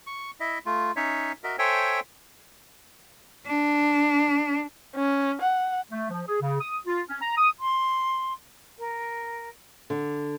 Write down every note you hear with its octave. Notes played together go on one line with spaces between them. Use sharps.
C#6
E4 D#5 E5
A3 F4
C#4 D#4 C#5 E5
F#4 A#4 D#5 E5
A4 C5 C#5 E5 G5 G#5
D4
C#4
F#5
A3
F3
G#4
C#3
D#6
F4
C#4
A#5
D#6
C6
A#4
D3